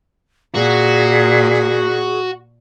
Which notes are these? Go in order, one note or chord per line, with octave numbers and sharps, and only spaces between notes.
A#2 F#4 G#4